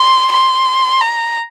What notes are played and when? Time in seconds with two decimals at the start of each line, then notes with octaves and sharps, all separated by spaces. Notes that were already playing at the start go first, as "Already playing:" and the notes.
Already playing: C6
0.31 C6
1.01 A#5